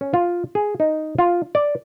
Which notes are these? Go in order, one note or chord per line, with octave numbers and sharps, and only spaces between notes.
C#4
F4
G#4
D#4
F4
D5